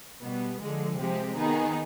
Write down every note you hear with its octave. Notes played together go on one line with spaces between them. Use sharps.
B2 G3 B3
D3 F3 G#3
C3 F3 G#3 C4 G4
D#3 B3 D#4 G#4